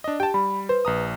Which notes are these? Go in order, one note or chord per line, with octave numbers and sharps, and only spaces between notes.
D4 D#5
G4 G5 A5
G3 B5
B4 C5
A#1 A#5 D#6